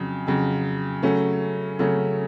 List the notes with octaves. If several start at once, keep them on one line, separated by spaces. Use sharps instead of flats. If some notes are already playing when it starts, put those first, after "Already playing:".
Already playing: F2 C#3 F#3
F2 C#3 F#3
C#3 F#3 A3 C#4
C#3 F#3 A3 C#4